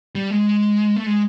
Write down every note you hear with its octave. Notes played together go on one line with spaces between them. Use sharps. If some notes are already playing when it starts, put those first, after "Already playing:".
G3
G#3
A3
G#3